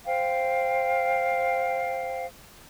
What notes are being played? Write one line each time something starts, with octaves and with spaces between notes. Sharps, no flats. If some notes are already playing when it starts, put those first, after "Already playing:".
C5 F5 G5